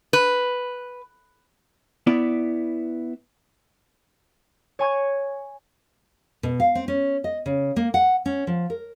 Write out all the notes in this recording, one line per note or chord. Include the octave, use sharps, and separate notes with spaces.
B4
B3 E4 D5
C#5 G#5 C#6 G#6
B2
F5
C4
C#4
D#5
C#3
A#3
F#5
C#4
F3
A#4